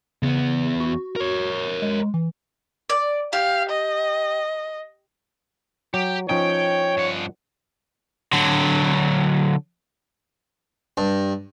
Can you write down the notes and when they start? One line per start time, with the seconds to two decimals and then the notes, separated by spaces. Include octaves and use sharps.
0.23 E2 C#3 B3
0.80 F#4
1.16 A#4 C#5
1.82 G#3
2.14 E3
2.90 D5
3.33 G4 F5
3.70 D#5
5.94 F#3 G4
6.29 F3 C#4 D#4 C#5 G5
6.97 G2 F#5
8.33 D3 F#3
10.97 G2